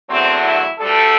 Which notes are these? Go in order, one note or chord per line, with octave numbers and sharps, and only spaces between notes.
E2 D3 F#3 A3 C4
E4
D2 D3 G3 A4